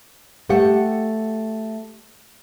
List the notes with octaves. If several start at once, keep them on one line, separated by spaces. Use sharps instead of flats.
A3 G4 F#5